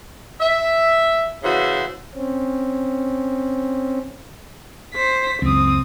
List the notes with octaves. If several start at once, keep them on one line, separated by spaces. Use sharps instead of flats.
E5
C#3 E3 F#4 C5 E5
C4 C#4
C5 B6
C#2 F#2 C4 D#6